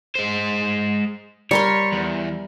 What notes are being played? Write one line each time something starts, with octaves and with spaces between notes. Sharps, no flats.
G#3 C5
G3 A#4 C#5 C6
E2